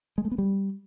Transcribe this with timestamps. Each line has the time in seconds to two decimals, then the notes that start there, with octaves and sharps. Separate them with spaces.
0.18 G#3
0.25 A3
0.32 B3
0.38 G3